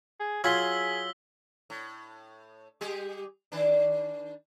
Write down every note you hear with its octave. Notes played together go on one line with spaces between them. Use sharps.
G#4
F#3 F4 G#4 G#5 E6 B6 G7
A2
G3 G4 G#4
D#3 D4